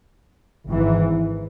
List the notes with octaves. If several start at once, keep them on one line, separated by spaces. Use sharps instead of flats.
G#1 G#2 E3